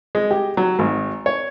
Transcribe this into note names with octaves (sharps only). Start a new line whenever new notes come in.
G#3
G4
F#3
G#1
C#5